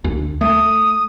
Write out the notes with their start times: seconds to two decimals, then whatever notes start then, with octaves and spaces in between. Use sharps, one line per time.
0.04 D2
0.41 A3 D#6